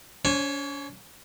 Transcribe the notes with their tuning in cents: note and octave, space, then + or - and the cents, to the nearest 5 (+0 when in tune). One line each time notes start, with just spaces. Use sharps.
C#4 +40 C#5 -45 G#5 +0